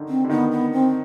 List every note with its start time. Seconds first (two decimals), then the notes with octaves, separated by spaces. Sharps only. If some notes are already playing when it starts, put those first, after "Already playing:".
Already playing: D3 D#3
0.09 C4
0.24 D3
0.29 D#3 B3
0.51 B3
0.72 C4